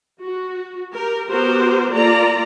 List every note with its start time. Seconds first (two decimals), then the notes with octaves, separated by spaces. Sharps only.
0.22 F#4
0.94 G4 A#4
1.31 B3 F#4 G4 A#4 C5
1.92 A#3 F4 A4 D5 A#5